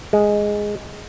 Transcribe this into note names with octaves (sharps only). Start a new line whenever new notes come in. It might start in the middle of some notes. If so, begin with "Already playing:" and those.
G#3